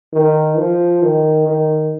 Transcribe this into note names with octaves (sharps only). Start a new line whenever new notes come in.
D#3
F3
D#3
D#3